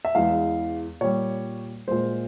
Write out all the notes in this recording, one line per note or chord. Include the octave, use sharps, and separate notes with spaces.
E5
E2 E3 G#3 F5
A#2 G3 C#5
A#2 G#3 C5